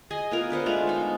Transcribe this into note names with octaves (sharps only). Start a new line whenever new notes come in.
G#4 D#5 G#5
B3 F4 A#4
D4 B4 C5 F#5
G#3 A3 F4
B3 D#4